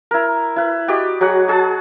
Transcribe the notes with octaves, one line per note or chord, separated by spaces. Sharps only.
E4 A#4
E4 B4
F#4 G4 D5 D#5
F#3 F#4 G#4 F#5
F#4 G#4 F#5 A5